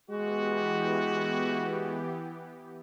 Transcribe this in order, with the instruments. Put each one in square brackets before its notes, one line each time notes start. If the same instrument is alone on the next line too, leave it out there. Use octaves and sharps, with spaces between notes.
[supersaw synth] E3 B3 G4 [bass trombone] G#3 [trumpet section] F#4